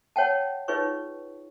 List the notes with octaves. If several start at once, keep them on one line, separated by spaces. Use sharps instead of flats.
C#5 F#5 G5 A5
D#4 F4 G#4 B4 C#5 C#6